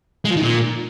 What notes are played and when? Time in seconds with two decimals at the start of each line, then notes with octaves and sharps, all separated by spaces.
0.25 G#3
0.30 F3
0.36 D#3
0.42 A#2